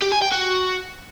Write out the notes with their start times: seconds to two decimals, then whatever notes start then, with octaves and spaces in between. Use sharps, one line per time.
0.02 G4
0.12 G#5
0.22 G5
0.32 F#4